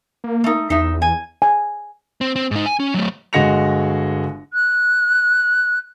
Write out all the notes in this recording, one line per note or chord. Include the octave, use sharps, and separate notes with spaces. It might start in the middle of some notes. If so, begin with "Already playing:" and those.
A#3
A3 D#4
E2 D#4 E5
G#5
G#5
C4
C4
G#2 D#4
G#5
C#4
F#3 A3
G1 G#3 F#4 A#6 C#7 F7
F#6